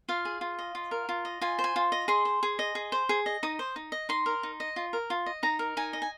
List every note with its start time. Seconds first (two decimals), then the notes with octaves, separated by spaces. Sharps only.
0.09 F4 F5
0.25 G#4
0.41 F4
0.59 D#5
0.75 F4
0.91 A#4
1.09 F4
1.25 D#5
1.41 F4 G#5
1.59 C5
1.64 G#5
1.76 F4
1.92 D#5
2.08 G#4 C6
2.25 C5
2.43 G#4
2.59 D#5
2.75 G#4
2.92 C5
3.09 G#4
3.26 D#5
3.43 D#4 D#6
3.59 C5
3.76 D#4
3.92 D#5
4.09 D#4 C6
4.26 A#4
4.43 D#4
4.60 D#5
4.76 F4
4.93 A#4
5.10 F4
5.26 D#5
5.43 D#4 A#5
5.59 A#4
5.77 D#4 G#5
5.93 D#5
6.02 G#5